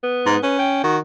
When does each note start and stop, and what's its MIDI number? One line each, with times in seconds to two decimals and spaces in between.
0.03 0.41 59
0.26 0.37 44
0.43 0.79 61
0.43 0.59 71
0.59 0.80 79
0.83 0.98 51
0.83 0.98 66